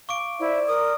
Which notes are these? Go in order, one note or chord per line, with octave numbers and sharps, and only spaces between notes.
F5 C#6 D6 D7
E4 C5 D5
A#4 D#6